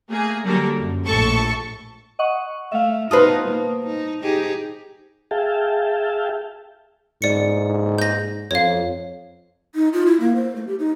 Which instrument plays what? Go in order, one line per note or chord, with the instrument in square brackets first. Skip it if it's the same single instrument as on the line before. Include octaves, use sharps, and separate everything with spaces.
[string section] A3 A#3 G#4
D3 F#3 G3 A#3 A4 A#4
F#2
A#1 A2 A4 A5 C#6
[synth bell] D#5 F#5 C#6
[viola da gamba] A3 [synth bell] E5 F5
[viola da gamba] B2 D#4 [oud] F4 F#4 B4 [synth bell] C5 A5 D#6
[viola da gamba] A#3
D#4
D#4 G4 G#4
[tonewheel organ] G#4 E5 F5 G5 A5
[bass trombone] G#2 [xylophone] D5 C#7
[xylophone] G6 A#6
[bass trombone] F2 [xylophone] C#5 F5
[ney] D#4
F4
E4
A#3
C5
A3
G4
D#4